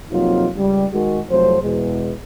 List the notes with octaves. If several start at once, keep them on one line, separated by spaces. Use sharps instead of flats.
F2 C3 F#3 A#3 D#4 F4
C#2 G3
D#3 G#3 F#4
C2 F2 F#3 A3 C5
E2 B2 G#3